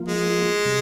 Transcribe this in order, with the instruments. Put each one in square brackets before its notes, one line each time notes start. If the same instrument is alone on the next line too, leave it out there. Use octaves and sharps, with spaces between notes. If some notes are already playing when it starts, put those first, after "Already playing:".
Already playing: [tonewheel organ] F3 A#3 F4
[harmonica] G#3
[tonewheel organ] C3 G3